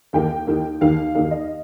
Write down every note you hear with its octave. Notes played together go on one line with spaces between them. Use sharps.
D#2 D#3 A#3 D#4 G5
D#2 D#3 A#3 D#4
D#2 D#3 A#3 D#4 F5
D#2 D#3 A#3 D#4 F5
D#5